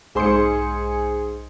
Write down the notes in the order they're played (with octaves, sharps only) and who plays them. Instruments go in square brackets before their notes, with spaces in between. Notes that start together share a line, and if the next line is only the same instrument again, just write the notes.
[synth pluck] B1 C#7 [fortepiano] G#2 C5 C6 [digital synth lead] G#4